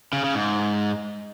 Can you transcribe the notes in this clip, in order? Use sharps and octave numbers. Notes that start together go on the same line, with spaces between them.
C#3
C#3
G#2